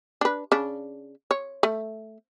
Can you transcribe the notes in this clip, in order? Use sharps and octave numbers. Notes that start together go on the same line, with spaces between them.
D4 B4
C#3 D4
C#5
A3